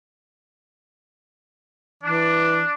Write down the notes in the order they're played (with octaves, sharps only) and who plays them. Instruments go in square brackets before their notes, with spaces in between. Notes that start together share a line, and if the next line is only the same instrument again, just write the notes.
[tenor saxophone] E3 [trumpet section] D4